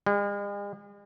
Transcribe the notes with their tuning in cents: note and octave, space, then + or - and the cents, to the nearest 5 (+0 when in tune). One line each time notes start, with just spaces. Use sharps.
G#3 -45